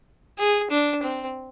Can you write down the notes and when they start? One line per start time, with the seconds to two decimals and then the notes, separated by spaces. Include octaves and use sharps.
0.39 G#4
0.71 D4
1.03 C4